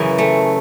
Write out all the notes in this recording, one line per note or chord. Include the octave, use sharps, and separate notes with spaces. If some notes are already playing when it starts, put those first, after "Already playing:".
Already playing: F#2 C#3 E3
A3